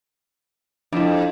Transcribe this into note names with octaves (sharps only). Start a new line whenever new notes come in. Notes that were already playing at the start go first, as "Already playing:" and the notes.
F2 D4 E4